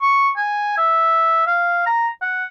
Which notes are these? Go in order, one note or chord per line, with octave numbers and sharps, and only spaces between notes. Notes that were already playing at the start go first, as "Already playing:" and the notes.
C#6
G#5
E5
F5
A#5
F#5